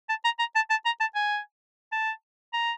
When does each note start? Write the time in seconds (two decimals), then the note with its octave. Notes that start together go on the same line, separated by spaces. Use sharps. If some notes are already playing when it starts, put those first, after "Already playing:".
0.09 A5
0.25 A#5
0.39 A#5
0.55 A5
0.70 A5
0.85 A#5
1.00 A5
1.15 G#5
1.92 A5
2.53 A#5